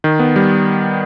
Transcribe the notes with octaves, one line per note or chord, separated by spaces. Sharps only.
D#3
B3
G3